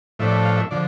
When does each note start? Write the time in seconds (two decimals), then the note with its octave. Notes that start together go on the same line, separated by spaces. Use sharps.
0.19 A2 F3 A3 D4 E5
0.27 D5
0.32 E5
0.45 F5
0.57 E5
0.71 D3 F3 D5